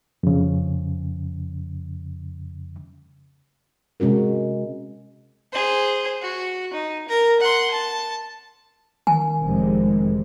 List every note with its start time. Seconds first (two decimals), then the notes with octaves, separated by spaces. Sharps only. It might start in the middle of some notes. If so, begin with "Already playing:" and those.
0.23 F2 C#3
4.00 C3 G#3 C#4 F#4 A#4
5.52 G#4 C5
6.22 F#4
6.73 D#4
7.09 A#4 A#5
7.40 F#5 C6
7.71 A5
9.07 D#3 G#5
9.42 F1 C3 G#3